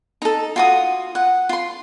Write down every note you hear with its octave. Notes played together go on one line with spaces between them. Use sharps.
D#4 A4
F4 F#4 D#6
F#5
F4 C6